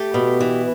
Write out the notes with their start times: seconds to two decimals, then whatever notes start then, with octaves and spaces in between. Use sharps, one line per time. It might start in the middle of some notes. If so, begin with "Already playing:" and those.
Already playing: A3 G4
0.14 B2
0.40 E3